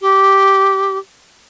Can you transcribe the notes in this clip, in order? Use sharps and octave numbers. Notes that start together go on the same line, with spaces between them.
G4